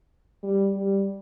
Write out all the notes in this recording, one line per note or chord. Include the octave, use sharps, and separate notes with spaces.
G3
G3